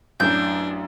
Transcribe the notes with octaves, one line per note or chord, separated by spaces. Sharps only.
A1 F#2 F#3 D4 E4 G6